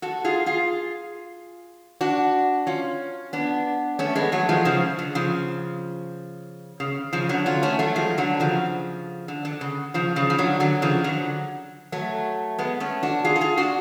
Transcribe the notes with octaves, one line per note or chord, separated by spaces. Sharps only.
F#4 A4
F4 G#4
F4 G#4
D4 F#4
C#4 F4
B3 D4
A3 C#4
G#3 B3
F#3 A3
F3 G#3
C#3 F3
D3
C#3 F3
C#3
C#3 F3
D3 F#3
C#4 F4
A3 C#4
F#3 A3
F3 G#3
D3 F#3
C#3 F3
D3
D3
C#3
C#3 F3
C#3 F3
F3
D3 F#3
D3 F#3
C#3 F3
D3 F#3
F#3 A3
G#3 B3
A3 C#4
D4 F#4
F4 G#4
A4
F4 G#4
D4 F#4